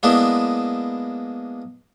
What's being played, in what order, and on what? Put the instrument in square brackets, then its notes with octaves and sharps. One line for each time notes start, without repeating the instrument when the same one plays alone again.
[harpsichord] G#3 A#3 B3 D4 E4